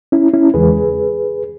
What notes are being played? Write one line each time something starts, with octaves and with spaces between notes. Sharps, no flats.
C#4 E4
C#4 E4
E2 C#3 E3 G#3 G#4 B4